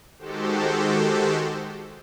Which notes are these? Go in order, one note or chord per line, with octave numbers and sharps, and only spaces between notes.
D#3 G#3 F#4 G4 A4 C5